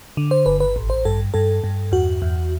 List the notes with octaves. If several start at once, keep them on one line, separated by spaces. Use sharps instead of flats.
D3
C5
G1 B4
B4
A1
C5
G2 A4
G2 A4
G2
E2 F#4
E2